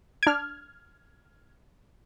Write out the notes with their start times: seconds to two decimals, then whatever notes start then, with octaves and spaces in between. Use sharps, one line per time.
0.23 D4 F6 G#6 D7